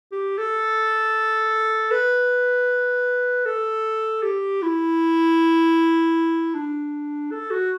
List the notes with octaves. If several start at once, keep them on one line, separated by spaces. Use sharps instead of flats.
G4
A4
B4
A4
G4
E4
D4
A4
F#4